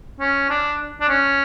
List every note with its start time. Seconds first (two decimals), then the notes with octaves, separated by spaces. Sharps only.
0.20 C#4
0.50 D4
1.01 D4
1.09 C#4